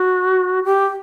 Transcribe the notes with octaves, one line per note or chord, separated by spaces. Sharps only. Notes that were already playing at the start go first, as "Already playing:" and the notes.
Already playing: F#4
G4